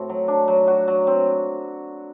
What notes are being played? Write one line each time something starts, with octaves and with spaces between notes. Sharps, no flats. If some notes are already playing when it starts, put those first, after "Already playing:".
Already playing: A2 C4 F#4
F#3
D4
F#3
F#4
F#3
C4